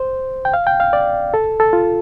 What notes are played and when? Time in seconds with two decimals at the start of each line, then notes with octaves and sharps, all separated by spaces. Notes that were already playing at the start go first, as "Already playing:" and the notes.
Already playing: C5
0.45 G5
0.54 F5
0.67 G5
0.80 F5
0.93 D5
1.34 A4
1.60 A4
1.73 F4